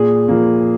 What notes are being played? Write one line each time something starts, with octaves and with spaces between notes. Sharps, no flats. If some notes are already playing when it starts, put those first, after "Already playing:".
Already playing: A#2 G#4
F3 A#3